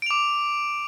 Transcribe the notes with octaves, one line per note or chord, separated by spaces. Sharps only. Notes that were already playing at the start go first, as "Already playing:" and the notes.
D6 D7 F7